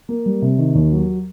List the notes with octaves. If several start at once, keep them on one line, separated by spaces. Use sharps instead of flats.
A#3
G3
C3
D#3
D#2
F#3